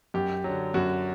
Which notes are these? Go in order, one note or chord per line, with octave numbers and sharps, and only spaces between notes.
F#2 G4
D3 F#3
F#2 F#4